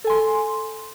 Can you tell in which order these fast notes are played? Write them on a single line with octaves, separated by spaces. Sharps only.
A4 G#5 C6